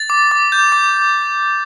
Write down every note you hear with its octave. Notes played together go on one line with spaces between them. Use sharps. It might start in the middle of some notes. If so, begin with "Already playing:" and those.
Already playing: A6
D6
D6
G6
D6